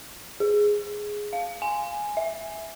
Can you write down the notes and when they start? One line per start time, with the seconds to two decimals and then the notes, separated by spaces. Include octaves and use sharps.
0.40 G#4
1.33 F5
1.62 G#5
2.17 E5